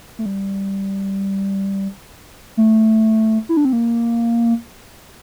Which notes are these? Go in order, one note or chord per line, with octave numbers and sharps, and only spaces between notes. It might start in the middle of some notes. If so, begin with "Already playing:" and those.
A3
G3
A3
E4
D4
C4
A#3